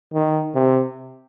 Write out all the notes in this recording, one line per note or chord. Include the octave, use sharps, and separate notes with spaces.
D#3
C3